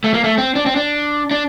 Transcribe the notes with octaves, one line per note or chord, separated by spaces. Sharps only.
A3
A#3
A3
C4
D4
C4
D4
D4